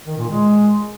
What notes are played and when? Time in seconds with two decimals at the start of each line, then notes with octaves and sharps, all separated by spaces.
0.07 D#3
0.17 A#2
0.28 G#3